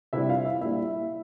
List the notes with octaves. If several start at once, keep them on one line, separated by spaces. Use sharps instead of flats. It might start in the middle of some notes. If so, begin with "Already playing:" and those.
C3 G3 E4 E5
F4 F5
E4 E5
A#2 G3 E4 E5